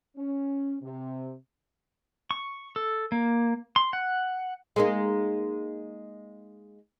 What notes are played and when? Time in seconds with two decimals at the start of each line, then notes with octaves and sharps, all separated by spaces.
0.17 C#4
0.82 C3
2.31 C#6
2.76 A4
3.12 A#3
3.76 C6
3.93 F#5
4.76 G#3 A#3 D#4